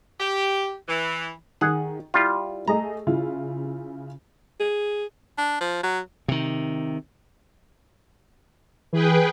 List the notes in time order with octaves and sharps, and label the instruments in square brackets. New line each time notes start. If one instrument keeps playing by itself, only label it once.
[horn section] G4
E3
[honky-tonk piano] D#3 [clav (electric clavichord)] G#4 F#5
[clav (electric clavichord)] G3 F4 [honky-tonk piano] E4
[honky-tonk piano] A3 G#4 D#5 [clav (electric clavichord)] A#5
[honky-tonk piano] C#3 E4 F4
[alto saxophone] G#4
[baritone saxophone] D4
F3
F#3
[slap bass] C3 D#3
[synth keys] E3 [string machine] G#4 B4 G5